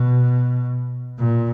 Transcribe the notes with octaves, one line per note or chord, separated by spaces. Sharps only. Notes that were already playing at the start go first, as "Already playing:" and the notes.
Already playing: B2
A#2